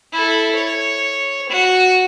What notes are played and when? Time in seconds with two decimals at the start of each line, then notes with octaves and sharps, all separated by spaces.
0.13 E4 A4
0.55 C#5
1.50 F#4